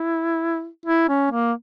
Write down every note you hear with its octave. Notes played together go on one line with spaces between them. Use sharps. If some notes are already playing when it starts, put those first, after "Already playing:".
Already playing: E4
E4
C#4
A#3